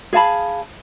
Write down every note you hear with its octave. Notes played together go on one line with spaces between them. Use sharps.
G#4 F5 A5 B5